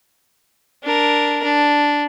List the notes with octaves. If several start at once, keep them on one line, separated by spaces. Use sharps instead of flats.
D4 A#4
D4